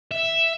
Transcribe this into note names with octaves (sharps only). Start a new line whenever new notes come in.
E5